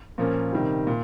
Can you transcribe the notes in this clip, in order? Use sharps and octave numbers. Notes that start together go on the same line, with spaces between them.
A#2 F3 A#3 C#4
C3 D#3 G3
A#2